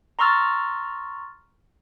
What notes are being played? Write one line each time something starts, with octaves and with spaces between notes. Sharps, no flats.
A#5 C6 C#6 E6 F6 A6